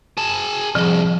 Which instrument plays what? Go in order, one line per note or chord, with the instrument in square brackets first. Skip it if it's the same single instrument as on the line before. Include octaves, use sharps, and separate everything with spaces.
[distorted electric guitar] G#4 A5
[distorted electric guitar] C2 F2 [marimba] F3 G#4